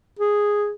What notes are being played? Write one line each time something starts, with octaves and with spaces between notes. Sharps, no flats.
G#4